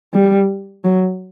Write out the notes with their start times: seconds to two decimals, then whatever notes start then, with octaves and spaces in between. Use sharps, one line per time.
0.14 G3
0.84 F#3